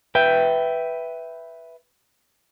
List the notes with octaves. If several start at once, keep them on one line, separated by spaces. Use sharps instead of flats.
B4 E5 G5